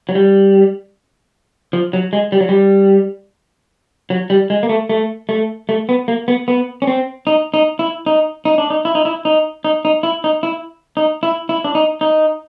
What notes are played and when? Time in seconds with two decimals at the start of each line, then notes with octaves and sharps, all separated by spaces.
0.09 F#3
0.15 G3
1.73 F3
1.93 F#3
2.13 G#3
2.32 G3
2.41 F#3
2.49 G3
4.10 F#3
4.30 G3
4.50 G#3
4.63 A#3
4.69 A3
4.89 A3
5.29 A3
5.69 A3
5.89 B3
6.08 A#3
6.28 B3
6.48 B3
6.82 C#4
6.87 C4
7.27 D#4
7.54 D#4
7.79 E4
8.06 D#4
8.45 D#4
8.58 D4
8.70 D#4
8.85 E4
8.95 D#4
9.05 E4
9.25 D#4
9.65 D#4
9.85 D#4
10.03 E4
10.24 D#4
10.43 E4
10.97 D#4
11.23 E4
11.49 E4
11.64 D4
11.75 D#4
12.01 D#4